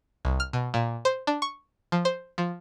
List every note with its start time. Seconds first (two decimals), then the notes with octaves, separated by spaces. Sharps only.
0.25 C2
0.40 F6
0.53 B2
0.74 A#2
1.05 C5
1.27 D4
1.42 C#6
1.92 F3
2.05 C5
2.38 F3